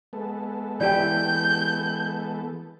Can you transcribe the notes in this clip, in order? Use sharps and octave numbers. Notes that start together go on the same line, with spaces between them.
G#3 B3 A4
E3 G4 D5 G5 G6